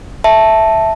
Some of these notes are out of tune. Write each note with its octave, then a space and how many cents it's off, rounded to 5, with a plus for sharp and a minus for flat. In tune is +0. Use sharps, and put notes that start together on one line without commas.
E5 +0 A5 +0